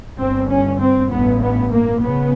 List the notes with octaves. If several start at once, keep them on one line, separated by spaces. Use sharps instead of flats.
G1 G2 C4
C#4
C4
A1 G2 B3
B3
A#3
C#3 B3